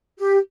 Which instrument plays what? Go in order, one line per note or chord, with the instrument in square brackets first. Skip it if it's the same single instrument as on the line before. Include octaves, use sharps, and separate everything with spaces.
[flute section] G4